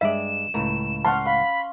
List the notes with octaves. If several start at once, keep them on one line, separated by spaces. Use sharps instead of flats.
G2 G#3 D5 E5 E7
C#2 A2 A#5
C#4 F#5 A5 C6 F6
F5 B5